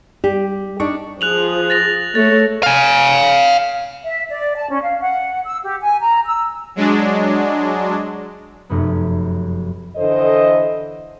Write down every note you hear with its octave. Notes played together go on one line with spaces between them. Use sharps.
G3 G4
D4 D#4 D5 C#6
F3 G#4 F#6 F7 F#7
A6 A#6 F7
A3 C#5 A6
F5 G#5
E5
D5
A5
C#4
F5
F#5
E6
G4
G#5
A#5
E6
F#3 G#3 D4
F1 F#2 B3
D3 E3 A4 C5 D#5